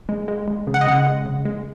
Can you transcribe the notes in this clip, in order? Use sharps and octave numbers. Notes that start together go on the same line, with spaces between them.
G#3
G#3
G#3
C#3
F#5
D#5
C#3 F#5
G#3
C#3
G#3